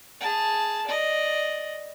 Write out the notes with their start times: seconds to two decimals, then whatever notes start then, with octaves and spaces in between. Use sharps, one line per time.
0.21 G#4 A5
0.86 D5 D#5